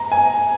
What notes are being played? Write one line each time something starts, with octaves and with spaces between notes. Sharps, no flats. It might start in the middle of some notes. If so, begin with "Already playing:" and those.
Already playing: A#5
G#5